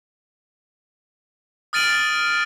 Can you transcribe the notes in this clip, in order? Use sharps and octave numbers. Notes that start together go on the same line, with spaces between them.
D#6 F6 A6 D7 D#7 F#7